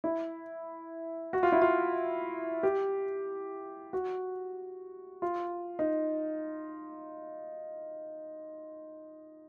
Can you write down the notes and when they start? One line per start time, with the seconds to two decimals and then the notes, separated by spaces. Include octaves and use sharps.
0.04 E4
1.33 F#4
1.43 F4
1.52 E4
1.62 F4
2.63 G4
3.93 F#4
5.22 F4
5.79 D#4